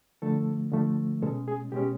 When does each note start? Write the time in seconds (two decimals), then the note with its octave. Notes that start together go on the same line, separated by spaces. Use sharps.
0.22 D3 F3 A3 A4
0.72 D3 F3 A3
1.22 B2 G#3 C#4 A4
1.48 G#4
1.72 B2 G#3 C#4 G4